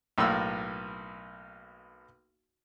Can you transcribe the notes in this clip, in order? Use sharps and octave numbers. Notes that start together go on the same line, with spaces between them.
B1 A2 A#3 E6